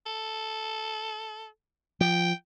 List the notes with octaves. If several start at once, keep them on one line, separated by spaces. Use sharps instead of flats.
A4
F3 G5